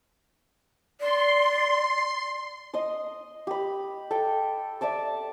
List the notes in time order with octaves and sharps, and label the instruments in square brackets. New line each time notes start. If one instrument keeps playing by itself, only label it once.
[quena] D5 [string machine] C6
[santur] D#5 C6 D#6
G4 B5
A4 G5
D5 E5 A5 D6